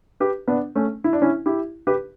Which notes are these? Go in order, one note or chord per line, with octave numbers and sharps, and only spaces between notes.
G4 B4
B3 D4
A3 C#4
E4
D4
C#4 E4
E4 G4
G4 B4